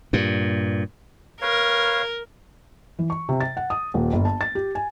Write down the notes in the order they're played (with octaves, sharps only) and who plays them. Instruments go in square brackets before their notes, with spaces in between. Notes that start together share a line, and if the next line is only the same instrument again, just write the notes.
[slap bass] G2 A#2
[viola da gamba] A#4 [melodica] B4 C#5 F5
[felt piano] E3
C#6
C3
A6
F#5
D#6
D#1
G1
A5
A6
G4
G#5